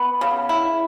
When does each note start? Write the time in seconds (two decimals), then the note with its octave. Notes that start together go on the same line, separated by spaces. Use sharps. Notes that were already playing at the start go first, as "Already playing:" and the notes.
Already playing: B3
0.21 C#3
0.49 E4